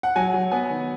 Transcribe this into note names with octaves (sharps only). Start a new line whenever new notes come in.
F#5
F#3 G#5
F#3
B3 G#5
D#3